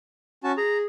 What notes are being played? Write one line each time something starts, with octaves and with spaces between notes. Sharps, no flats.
C#4 F#4 A5
G#4 A#5